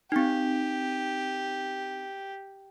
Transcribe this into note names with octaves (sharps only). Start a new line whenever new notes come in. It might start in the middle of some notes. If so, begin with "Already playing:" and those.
C4 D#4 G4